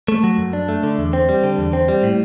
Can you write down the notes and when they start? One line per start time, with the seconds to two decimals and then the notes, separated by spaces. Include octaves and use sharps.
0.08 A3
0.24 F#3
0.38 F#2
0.53 D4
0.69 A3
0.83 D3
0.99 E2
1.13 C4
1.29 G3
1.43 D3
1.58 E2
1.73 C4
1.88 G3
2.03 A2